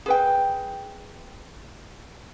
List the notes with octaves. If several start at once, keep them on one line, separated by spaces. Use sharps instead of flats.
G#4 B4 G5